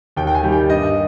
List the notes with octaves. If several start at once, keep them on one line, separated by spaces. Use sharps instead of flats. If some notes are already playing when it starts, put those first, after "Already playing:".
D#2 G5
G5
G#5
D#3 G3
G5
G2 D#5